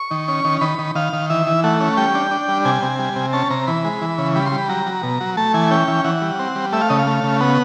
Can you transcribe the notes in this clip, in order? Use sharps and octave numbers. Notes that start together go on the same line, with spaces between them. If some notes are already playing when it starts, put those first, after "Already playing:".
Already playing: C#6
D#3
C#4
D#3
D#3 B5
D#3
D#3 F5
D#3
E3 E5
E3
A3 F#5
C#4
G3 G5
D4
D4
G3
C3 G#5
C3
G3
C3
C#4 A5
C3 A#5
E3 B5
G#3
E3
C#3
G3 B5
C6
G3
B5
F#3 A#5
F#3
B2
F#3
A3 A5
E3 G#5
C#4 G5
E3
E3 F#5
G3
C4
G3
A3 E5
F5
C#3 D#5
F5
A3
C#3
B3 F#5